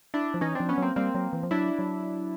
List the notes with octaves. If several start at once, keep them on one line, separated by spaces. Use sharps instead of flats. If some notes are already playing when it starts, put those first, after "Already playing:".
D4 E4
F3
E3 C#4 D#4
F3 C4 D4
B3 C#4
F#3 A#3 C4
G3 A#3 C4
F#3
E3
F3
F#3 D4 E4
F#3